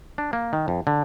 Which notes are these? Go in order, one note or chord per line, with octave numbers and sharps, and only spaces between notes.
D4
A#3
D#3
F2
D3